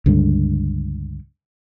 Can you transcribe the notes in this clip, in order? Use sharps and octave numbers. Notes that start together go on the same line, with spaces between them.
C#2 G2 D3